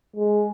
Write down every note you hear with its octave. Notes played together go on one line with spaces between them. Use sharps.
G#3